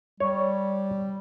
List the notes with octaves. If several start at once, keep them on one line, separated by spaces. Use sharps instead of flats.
G3 C#5